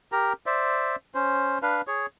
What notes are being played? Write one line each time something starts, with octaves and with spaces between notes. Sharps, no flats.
G4 A#4 A#5
C5 D5 E5
C#4 C5
D4 B4 F5
G#4 C#5